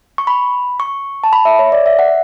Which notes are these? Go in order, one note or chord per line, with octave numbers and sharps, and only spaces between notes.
C#6
B5
C#6
A5
B5
E5
C#5
D5
E5
F#5